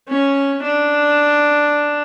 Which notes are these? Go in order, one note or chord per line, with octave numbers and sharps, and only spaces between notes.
C#4
D4